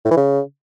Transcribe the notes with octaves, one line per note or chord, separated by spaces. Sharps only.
A2
E3
C#3